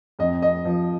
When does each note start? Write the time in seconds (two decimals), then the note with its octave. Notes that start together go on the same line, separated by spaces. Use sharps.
0.19 F2 D#5
0.42 F2 D#5
0.65 F3